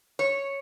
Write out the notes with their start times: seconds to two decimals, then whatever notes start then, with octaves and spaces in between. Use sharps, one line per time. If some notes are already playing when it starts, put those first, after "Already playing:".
0.19 C#5